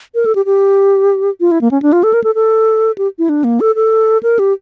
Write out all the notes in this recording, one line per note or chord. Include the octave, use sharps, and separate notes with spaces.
A#4
A4
G4
G4
F4
E4
A#3
C#4
D4
F4
A4
A#4
A4
A4
G4
E4
D4
A#3
A4
A4
A#4
G4